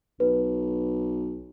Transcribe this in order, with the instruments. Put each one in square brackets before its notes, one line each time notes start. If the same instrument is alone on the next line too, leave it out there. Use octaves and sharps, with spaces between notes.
[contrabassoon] B1 [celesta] B4